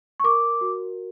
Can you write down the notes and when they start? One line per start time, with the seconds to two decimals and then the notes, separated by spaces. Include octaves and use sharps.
0.20 C#6
0.24 A#4 D6
0.61 F#4